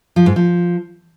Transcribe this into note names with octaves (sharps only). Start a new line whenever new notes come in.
F3
G#2
F3